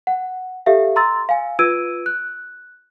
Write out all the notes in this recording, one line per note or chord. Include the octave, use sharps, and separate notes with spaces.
F#5
G4 A4 E5 F5
A#5 C6 E6 A6
F5 G#5
F4 B4 E6 G#6 D7 D#7
F#6